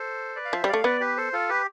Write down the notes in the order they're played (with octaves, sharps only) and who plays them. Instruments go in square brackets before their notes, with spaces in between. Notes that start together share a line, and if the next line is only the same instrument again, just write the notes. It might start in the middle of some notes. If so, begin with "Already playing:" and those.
Already playing: [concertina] A4 C5
B4 D5
F5
[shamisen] F3 [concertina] C5 E5
[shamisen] G3
[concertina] D5 F5
[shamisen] A3
[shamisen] B3 [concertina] B4 D5
[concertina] G4 B4
A4 C5
F4 A4
G4 B4